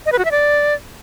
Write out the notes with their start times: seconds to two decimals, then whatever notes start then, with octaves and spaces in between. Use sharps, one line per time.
0.06 D#5
0.12 B4
0.19 F#4
0.25 E5
0.31 D5